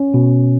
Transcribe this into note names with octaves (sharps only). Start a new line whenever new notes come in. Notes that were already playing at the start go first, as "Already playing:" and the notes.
Already playing: C#4
B2